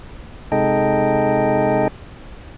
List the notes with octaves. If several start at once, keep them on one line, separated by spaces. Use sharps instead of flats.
C3 G#3 D#4 A4 D#5 G5